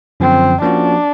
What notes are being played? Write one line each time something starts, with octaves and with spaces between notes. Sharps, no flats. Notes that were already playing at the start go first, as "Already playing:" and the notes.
F#2 D3 F3 C4
F3 A#3 C#4 D4 F#4